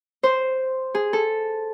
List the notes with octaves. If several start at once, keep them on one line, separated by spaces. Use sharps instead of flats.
C5
G#4
A4